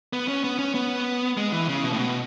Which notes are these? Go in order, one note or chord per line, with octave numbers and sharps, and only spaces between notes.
B3
C#4
B3
C#4
B3
G#3
E3
C#3
B2
A2
B2